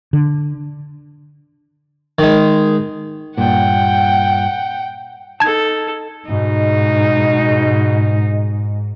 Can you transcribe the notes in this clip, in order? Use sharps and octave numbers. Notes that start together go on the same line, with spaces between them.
D3
D#3 G#3
G2 A#2 F#5 G5
D#4 A4 A5 G#6
G#2 B2 D#4